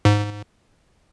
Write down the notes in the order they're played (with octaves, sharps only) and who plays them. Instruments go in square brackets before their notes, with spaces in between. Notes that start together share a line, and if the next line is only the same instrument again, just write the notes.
[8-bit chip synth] G#2